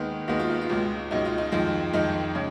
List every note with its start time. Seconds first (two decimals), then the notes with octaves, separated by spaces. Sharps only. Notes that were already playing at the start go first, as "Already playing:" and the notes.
Already playing: D#2 D#3 G#3 B3
0.28 D#2 D#3 G#3 B3 F#4
0.40 F4
0.50 D#4
0.61 F4
0.69 C#2 B2 G#3
1.11 C#2 B2 G#3 D#4
1.25 F4
1.38 D#4
1.52 F2 D#3 G#3 F4
1.93 F2 D#3 G#3 D#4
2.35 C#3 G#3